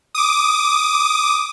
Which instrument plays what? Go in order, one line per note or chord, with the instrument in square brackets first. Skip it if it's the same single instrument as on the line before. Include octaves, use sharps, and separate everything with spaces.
[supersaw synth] D6 D#6